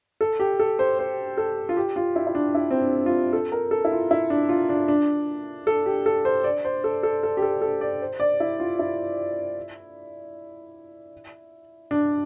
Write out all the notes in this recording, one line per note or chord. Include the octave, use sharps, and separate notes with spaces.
A4
G4
A4
C5
C5
A4
F4
G4
F4
E4
E4
D4
E4
C4
D4
F4
A4
A#4
A4
E4
F4
E4
D4
F4
D4
D4
A4
G4
A4
C5
D5
C5
A4
A4
A4
G4
A4
A4
D5
C5
D5
E4
F4
E4
D4